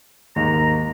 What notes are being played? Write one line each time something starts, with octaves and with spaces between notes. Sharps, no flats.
D#2 G#2 A#5